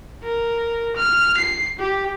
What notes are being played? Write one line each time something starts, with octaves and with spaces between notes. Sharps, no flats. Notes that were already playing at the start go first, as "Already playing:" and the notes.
A#4
F6
C7
G4